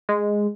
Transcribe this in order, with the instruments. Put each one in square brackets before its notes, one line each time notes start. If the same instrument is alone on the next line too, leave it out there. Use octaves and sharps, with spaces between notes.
[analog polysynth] G#3